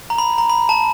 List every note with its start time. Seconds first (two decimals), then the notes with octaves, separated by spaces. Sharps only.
0.10 A#5
0.18 B5
0.38 A#5
0.50 B5
0.69 A5